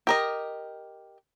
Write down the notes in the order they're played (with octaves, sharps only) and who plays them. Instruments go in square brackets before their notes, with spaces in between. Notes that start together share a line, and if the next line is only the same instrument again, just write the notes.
[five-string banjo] G4 A#4 D#5